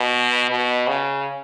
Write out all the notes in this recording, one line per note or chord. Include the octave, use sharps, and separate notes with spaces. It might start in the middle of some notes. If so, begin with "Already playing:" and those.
Already playing: B2
B2
C#3